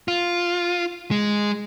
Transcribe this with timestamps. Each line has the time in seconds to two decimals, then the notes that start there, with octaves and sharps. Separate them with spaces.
0.08 F4
1.11 G#3